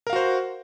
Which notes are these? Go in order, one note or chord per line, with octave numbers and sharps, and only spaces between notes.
F#4 A#4 C5 F5